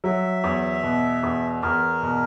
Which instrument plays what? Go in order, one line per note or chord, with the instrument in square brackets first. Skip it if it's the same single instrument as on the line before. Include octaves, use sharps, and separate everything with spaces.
[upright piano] F#3 [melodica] E5
[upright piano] E2
B2
E2
[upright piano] E2 [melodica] A#4
[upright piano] B2